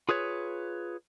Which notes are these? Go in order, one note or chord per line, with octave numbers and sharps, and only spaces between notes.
F4 G#4 B4 C#5